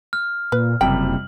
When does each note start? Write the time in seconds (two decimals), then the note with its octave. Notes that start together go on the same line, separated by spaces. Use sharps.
0.13 F6
0.52 A#2 B4
0.81 F#1 F2 C3 G3 G5 F#7